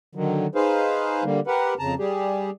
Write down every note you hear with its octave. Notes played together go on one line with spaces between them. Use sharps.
D3 D#3 F#3
D#4 G#4 B4 C5 F5
D3 G3 A#3
G4 A#4 B4 F#5
F2 C#3 A5 A#5
G3 G4 G#4